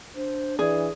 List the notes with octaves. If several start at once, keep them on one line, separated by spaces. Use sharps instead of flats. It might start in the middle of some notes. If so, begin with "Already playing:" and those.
D4 C5
E3 G#4 D5